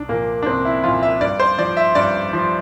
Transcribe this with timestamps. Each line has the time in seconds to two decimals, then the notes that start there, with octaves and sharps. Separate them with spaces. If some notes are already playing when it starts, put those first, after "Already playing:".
Already playing: C2 D4
0.09 A#2 F3 A#3
0.43 D4
0.46 C2 C4
0.65 E4
0.84 A#2 F3 F4
1.03 E5
1.21 G2 D5
1.40 C5
1.58 F3 D5
1.77 E5
1.95 G2 D5
2.33 F3